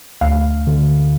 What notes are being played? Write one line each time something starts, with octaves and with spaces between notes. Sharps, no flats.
D2 F5
D3